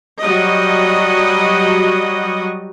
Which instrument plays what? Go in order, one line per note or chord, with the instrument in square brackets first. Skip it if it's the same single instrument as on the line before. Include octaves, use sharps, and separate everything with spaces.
[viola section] F#3 G3 F#4 D#5